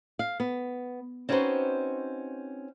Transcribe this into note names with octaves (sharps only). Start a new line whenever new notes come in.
F5
B3
C4 C#4 D#4 F#4 B4 C5